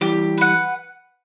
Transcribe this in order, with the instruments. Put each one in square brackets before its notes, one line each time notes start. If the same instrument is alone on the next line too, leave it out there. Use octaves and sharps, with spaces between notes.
[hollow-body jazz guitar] E3 G3 [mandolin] G4
[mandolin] B4 F#5